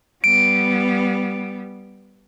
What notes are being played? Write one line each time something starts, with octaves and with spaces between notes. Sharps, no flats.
G3 B3 D7